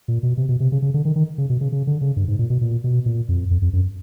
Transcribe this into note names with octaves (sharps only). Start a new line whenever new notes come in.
A#2
B2
C3
B2
C3
C#3
C#3
D3
D#3
D#3
C#3
B2
C#3
C#3
D3
C#3
G2
G#2
A#2
B2
A#2
B2
A#2
F2
F2
F2
F#2